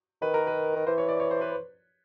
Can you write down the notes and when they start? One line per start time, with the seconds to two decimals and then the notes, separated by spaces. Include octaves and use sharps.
0.22 D#3 B4
0.34 A#4
0.47 B4
0.76 D#3
0.87 E3 C5
0.98 C#5
1.09 D5
1.20 C#5
1.31 C5
1.41 B4